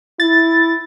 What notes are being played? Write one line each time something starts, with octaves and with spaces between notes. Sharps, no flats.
E4 A6